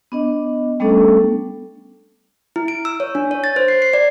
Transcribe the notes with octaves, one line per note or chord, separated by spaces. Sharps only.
B3 D4 D#5
G3 A3 B3 C#4 D4 A4
E4
D7
E6
C#5
D4
C#5
A6
C5
C7
C7
D5